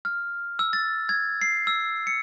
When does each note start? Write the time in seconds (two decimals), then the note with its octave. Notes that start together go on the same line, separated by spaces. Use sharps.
0.05 F6
0.59 E6
0.73 A6
1.09 G#6
1.41 C7
1.67 E6
2.07 C#7